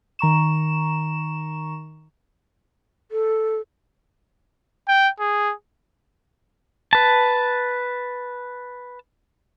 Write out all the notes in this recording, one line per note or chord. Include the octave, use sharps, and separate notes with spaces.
D#3 A#5 C#6 E7
A4
G5
G#4
B4 A5